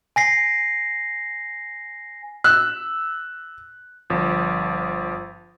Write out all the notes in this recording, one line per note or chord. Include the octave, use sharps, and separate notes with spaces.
G#5 A#6 C7
E6 F#6
G1 F3